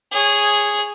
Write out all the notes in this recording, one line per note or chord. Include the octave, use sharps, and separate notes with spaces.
G#4 C#5